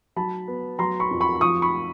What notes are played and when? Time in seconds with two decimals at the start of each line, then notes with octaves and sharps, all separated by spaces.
0.16 F#3 A5 B5
0.48 B3
0.79 F#3 A#5 C6
1.00 B5 C#6
1.11 F2
1.21 B5 C#6
1.41 F3 C#6 D#6
1.62 B5 C#6